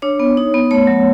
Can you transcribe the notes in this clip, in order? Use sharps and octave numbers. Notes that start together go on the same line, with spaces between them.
D4 C#5
B3
D#4
B3
A3 C#5
F#3